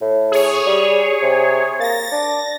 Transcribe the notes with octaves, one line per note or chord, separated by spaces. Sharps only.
A2
G#4 C#5
G3
C3
A#3 A6 A#6
D4